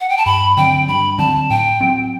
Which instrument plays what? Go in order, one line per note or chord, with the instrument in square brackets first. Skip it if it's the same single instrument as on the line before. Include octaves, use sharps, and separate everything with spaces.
[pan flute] F#5
G5
A5
[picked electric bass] G2 [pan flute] B5
[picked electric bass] D3 F#3 C4 [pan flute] G5
[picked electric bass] G2 [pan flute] B5
[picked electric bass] D3 F#3 C4 [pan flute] A5
[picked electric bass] A2 [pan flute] G5
[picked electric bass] F#3 C4